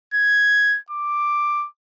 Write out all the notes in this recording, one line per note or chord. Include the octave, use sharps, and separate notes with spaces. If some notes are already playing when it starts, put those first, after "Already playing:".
G#6
D6